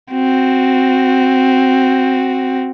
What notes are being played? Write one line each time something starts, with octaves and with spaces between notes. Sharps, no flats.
C4 F#4